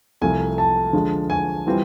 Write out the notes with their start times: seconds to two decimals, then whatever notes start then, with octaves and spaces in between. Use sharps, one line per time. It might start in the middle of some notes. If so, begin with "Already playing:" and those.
0.21 C2 C3 F3 A3 G#5
0.58 A5
0.93 D3 F3 G#3
1.30 G#5
1.67 E3 G3 C4 F4